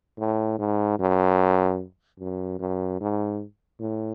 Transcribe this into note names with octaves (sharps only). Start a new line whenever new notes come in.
A2
G#2
F#2
F#2
F#2
G#2
A2